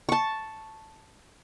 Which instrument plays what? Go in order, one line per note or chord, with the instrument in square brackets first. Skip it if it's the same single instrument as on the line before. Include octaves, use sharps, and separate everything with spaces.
[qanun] A5 C#6